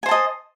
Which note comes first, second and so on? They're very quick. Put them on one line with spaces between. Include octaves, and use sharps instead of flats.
G#5 C5 A5 D#5